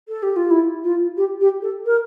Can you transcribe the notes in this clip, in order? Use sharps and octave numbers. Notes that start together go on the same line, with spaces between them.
A4
G4
F4
E4
F4
G4
G4
A4
A#4